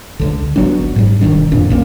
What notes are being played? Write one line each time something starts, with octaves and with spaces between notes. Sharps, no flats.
C#2 D3
G1 F#3 B3 D4
G#2 G3
E1 C#2 D#3 D4
F2 A#2 D4
B1 A#3 C#4